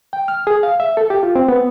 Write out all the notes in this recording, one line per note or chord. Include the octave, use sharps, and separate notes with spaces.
G5
F6
G#4
F5
E5
A4
G4
F4
C4
B3